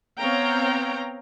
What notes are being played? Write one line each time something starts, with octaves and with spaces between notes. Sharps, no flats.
B3 C4 C#5 F5 G5 A#5